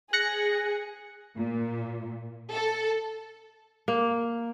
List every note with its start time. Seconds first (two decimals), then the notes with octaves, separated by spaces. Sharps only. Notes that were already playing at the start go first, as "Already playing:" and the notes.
0.13 G#4 F#6 A#6 C#7
1.36 A#2
2.53 A4
3.88 A#3